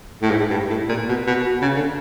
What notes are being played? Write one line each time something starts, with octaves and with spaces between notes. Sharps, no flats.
A2
G#2
G2
A2
A#2
B2
B2
C#3
D3